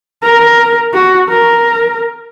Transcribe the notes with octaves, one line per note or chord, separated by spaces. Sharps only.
A#4
F#4
A#4